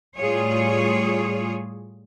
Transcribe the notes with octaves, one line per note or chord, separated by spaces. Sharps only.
A2 G3 F4 G#4 C#5